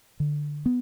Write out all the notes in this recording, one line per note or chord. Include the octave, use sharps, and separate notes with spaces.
D3
B3